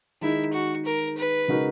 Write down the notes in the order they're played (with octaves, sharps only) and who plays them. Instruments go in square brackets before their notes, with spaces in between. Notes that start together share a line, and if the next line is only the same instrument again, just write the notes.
[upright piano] D#3 G#3 D#4 G#4 [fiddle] E4
[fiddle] F#4
A#4
B4
[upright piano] C#3 G#3 D#4 F#4 A#4